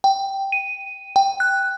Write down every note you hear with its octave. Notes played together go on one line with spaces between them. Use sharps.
G5
D#7
G5
F#6